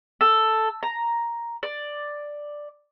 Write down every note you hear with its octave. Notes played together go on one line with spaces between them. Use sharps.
A4
A#5
D5